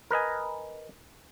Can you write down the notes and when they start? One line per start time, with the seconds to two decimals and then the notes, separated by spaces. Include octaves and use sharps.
0.11 A#4 B4 D#5 G#5